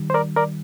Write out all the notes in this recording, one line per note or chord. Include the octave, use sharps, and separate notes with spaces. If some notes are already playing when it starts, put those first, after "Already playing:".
Already playing: D#3 G3
C5
A#4 D5
A#4 D5